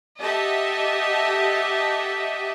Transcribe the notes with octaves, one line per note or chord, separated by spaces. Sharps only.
G4 A4 D#5 E5 F#5 A5